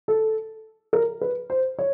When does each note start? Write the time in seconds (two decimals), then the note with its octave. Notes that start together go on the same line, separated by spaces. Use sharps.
0.08 A4
0.93 A#4
1.21 B4
1.50 C5
1.79 C#5